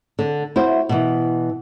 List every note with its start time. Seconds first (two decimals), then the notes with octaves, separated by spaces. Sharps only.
0.19 D3
0.56 E4 F#4 C5
0.89 B2 E3